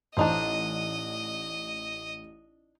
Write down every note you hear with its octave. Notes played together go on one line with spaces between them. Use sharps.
A1 D4 D#4 C5 D#5